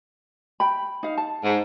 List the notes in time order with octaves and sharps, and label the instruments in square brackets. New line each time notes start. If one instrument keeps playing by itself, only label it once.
[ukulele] G5 B5
D#4 F5
A5
[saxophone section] G#2